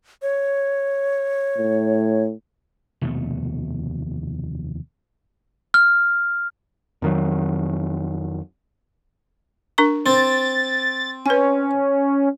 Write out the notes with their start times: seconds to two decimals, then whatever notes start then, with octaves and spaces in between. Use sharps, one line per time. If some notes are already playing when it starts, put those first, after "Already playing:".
0.22 C#5
1.58 A2
3.01 F1 D#2 B2 A3
5.74 F6
7.02 F2 D#3 F#3
9.78 D4 A#4 C#6
10.06 C4 A6
11.26 C#4 B4 G#5